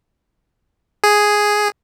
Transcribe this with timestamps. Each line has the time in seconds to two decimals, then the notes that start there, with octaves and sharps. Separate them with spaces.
1.04 G#4